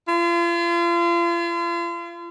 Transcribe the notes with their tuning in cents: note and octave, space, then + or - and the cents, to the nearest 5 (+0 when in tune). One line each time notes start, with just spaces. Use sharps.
F4 -40